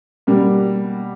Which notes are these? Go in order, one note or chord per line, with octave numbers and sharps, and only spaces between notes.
B2 G3 A#3